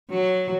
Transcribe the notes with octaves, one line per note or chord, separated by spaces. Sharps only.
F#3